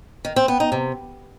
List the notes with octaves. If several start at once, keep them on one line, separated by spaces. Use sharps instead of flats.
D#3
C4
B3
D#4
C3